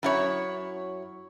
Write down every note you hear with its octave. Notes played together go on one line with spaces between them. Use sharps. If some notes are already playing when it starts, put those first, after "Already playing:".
F#2 E4 C#5